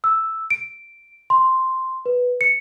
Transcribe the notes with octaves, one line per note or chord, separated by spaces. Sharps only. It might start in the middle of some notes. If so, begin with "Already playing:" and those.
E6
D7
C6
B4
C#7